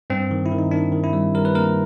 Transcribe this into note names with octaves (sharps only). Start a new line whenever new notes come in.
G2 C4
D#3
E4
D#3
D#4
D#3 D4
D#3
E4
G3
G3 A#4
B4
A#3 A#4